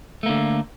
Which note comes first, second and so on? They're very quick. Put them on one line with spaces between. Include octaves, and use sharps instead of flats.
A3 A#3 D3